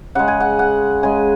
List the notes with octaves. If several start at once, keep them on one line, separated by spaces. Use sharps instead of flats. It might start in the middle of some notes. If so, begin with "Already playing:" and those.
C#3 G#3 F#5
G#5
F#5
F#5
C#3 G#3 G#5